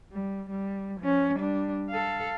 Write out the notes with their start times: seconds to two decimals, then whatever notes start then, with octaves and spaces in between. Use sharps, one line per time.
0.13 G3
0.49 G3
1.00 F3 C#4
1.36 G3 D4
1.90 A4 F5